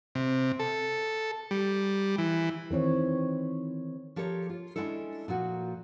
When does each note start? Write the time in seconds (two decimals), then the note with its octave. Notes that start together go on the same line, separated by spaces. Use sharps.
0.15 C3
0.59 A4
1.51 G3
2.18 E3
2.71 D#3 E3 C4 C#5
4.16 F3 G4 A4 A#4 C#5
4.50 F4
4.76 G#3 A#3 C#4 D4 E4 A4
5.28 A#2 F3 A#3 F#4